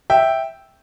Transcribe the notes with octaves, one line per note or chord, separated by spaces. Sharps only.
E5 G5